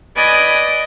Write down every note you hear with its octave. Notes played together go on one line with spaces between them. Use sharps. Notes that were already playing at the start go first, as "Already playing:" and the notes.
B4 D5 D#5 G#5